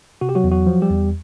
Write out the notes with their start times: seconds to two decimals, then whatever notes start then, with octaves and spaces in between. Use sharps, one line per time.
0.21 C3 F#4
0.29 G4
0.35 F#3 F#4
0.44 E2
0.52 F#3 F#4
0.67 F3
0.82 G3 G4
0.90 E2